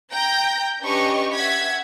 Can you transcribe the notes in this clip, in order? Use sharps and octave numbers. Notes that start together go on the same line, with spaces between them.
G5 A#5 G6 A#6
C#4 D4 G4 B4 D#5 C#6
E5 F#5 G#6 B6